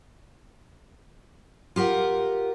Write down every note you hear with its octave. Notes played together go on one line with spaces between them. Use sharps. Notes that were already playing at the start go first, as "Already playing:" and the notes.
F4 G4 A#4 F#5